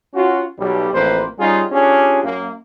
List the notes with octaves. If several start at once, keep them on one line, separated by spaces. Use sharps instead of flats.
C#4 F4 F#4
B1 G3
A1 F2 A#3 B4 C5
G3 C#4 D#4 F4 G#4
C#4 D4 F4 G4 G#4
F#2 A#3